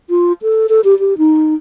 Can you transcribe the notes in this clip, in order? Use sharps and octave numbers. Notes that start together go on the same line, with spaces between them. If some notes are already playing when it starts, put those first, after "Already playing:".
F4
A4
A4
G4
G4
D#4